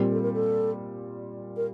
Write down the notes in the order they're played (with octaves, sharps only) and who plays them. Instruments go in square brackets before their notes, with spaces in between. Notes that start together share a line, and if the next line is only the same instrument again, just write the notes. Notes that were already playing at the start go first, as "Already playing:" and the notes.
Already playing: [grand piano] A#2 G3 C4 G4
[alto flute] A4
A#4
A4
A#4